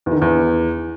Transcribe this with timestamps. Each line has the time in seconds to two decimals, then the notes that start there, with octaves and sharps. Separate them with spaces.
0.06 E2
0.11 D#3
0.16 D3
0.22 E2